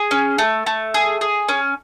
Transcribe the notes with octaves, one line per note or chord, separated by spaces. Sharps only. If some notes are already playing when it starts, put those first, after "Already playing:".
Already playing: G#4
C#4
A3
A3
G#4
G#4
C#4